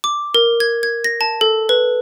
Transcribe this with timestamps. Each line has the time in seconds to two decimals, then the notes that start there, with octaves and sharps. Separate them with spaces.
0.04 D6
0.35 A#4
0.60 G#6
0.83 G#6
1.04 A#6
1.21 A5
1.41 A4
1.69 B4